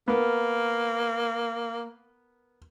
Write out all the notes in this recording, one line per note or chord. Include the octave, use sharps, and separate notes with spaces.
A#3 B3 A#4